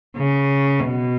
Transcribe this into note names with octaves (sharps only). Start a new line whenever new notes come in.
C#3
B2